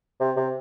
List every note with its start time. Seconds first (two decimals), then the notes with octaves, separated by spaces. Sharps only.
0.20 C3
0.37 C3